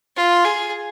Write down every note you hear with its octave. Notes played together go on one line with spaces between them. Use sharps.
F4
G#4